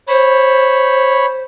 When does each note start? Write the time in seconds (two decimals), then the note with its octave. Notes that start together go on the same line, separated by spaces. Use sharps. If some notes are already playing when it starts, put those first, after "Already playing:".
0.08 C5 C#5 B5